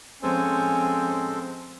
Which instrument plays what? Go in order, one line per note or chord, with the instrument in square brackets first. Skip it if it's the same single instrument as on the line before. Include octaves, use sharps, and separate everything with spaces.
[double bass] F3 C4 [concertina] G#3 A4 C5 [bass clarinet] C#4